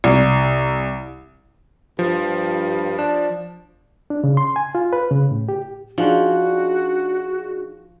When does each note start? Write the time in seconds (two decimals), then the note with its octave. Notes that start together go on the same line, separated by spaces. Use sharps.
0.04 C2
1.99 G2 F3
2.98 D4
4.10 D4
4.24 C#3
4.37 C6
4.56 G#5
4.75 F4
4.93 B4
5.11 C#3
5.31 A2
5.49 G4
5.98 F3 D4 D#4 F#4 G#4